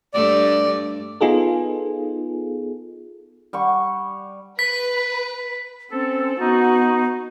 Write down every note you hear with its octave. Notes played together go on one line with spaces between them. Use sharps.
G2 A3 D5
B3 D#4 F4 G#4 A4
G3 F#5 C#6
B4 B6
C4 C#4 A4
B3 D#4 F#4